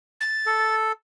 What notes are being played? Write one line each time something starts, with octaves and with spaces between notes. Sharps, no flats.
A6
A4